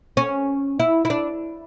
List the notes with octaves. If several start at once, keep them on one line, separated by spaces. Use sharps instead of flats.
C#4
E4
E4
D4